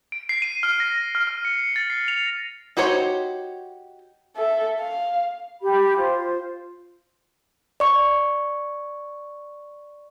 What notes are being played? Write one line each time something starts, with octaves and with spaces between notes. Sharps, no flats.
D7
C7
D#7
F6
A#6
F6
F6
C#7
A6
C7
F7
D#4 F#4 G4 C5 C#5
A4 E5
F5
G4 B5
F4 C5
D5 C#6